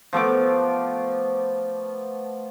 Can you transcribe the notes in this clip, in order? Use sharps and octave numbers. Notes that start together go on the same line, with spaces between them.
F3 A3 B3 D6